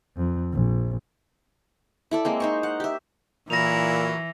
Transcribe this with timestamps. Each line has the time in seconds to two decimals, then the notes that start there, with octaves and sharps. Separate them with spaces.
0.17 F2
0.53 A#1
2.11 E4 A4 D5
2.25 G#3 A#3 C4
2.40 D#4 C5 C#6
2.63 F#5
2.80 G4 E5
3.50 A#2 E3 F#3 E4 A#4 A#6 F7